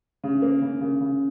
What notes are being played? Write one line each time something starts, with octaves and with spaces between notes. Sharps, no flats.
C#3
A#3
C#3
C#3
C#3